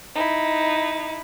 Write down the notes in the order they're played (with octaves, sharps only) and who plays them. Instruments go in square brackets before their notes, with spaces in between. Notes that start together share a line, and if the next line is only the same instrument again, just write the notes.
[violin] D#4 E4